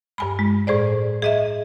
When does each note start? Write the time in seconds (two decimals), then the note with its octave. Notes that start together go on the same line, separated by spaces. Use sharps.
0.18 G2 G#5 B5
0.39 G#3
0.67 A2 G#4 C5 D5
1.22 G#4 D#5 E5